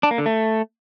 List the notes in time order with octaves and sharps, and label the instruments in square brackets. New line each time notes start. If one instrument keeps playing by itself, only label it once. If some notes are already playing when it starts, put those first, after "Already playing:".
[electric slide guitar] D4
A#3
D3
A3